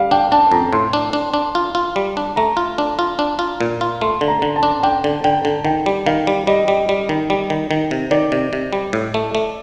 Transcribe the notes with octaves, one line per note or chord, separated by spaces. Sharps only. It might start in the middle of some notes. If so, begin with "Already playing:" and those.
Already playing: G3 F5
D4 G5
D4 A5
F2 A#5
A2 C6
D4
D4
D4
F4
F4
G3
D4
A3 A#5
F4
D4
F4
D4
F4
A#2
F4
A3 C6
D3
A#5
D3
A5
D4
D4 G5
D3
D3 G5
D3
D#3 G5
G3
D#3 F5
G3
G3 D#5
G3
G3
D#3
G3
D#3
D#3
C3
D#3 D5
C3
C3
G3
A2
A3
A3